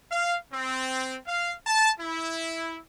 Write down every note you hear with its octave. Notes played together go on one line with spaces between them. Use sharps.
F5
C4
F5
A5
E4